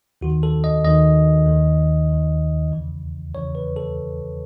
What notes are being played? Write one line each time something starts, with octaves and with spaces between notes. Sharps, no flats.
D#2 D#3 F#4
A4
D#5
D#2 D#3 D#5
D#2 D#3
D#3
D#2
E2 C#3 E3
E2 C#3 E3 C#5
B4
A4